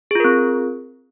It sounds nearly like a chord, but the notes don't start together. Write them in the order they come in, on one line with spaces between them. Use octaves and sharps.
G#4 F4 A#4 C4